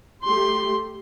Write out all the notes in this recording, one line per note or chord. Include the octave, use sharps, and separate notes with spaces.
A3 G4 C6